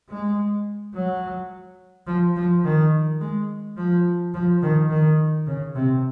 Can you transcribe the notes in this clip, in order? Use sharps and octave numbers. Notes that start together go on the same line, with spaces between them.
G#3
F#3
F3
F3
D#3
G#3
F3
F3
D#3
D#3
C#3
C3